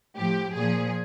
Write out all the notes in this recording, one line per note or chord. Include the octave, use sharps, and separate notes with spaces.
A2 F3 G4
A#2 F3 G#4